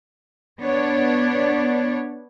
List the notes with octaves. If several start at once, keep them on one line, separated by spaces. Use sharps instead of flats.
B3 D4 C#5 D5